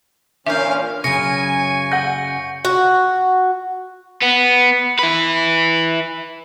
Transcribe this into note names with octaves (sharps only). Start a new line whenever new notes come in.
A#2 E3 C#4 D4 A#4 E5 F5 G6
F#2 C#3 G#5 C#6 A#6 C#7
F#5 G6 A#6
F#4
B3
E4 B4